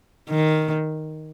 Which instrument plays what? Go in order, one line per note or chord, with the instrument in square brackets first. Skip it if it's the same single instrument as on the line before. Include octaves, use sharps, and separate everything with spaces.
[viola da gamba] D#3